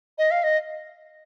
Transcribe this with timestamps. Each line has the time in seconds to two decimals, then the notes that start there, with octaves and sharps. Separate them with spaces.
0.18 D#5
0.31 F5
0.43 D#5